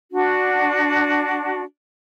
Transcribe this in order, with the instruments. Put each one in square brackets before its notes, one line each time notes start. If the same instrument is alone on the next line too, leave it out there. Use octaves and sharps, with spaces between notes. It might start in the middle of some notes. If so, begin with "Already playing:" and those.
[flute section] D4 F#4